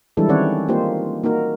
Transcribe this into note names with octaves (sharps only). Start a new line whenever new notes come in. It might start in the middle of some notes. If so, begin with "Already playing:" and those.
E3 G3 G#3 D4 E4 A4
D#3 C4 C#4 C#5 D5 F#5
A#3 D#4 F4 G4 C5
A#3 D#4 F#4 A#4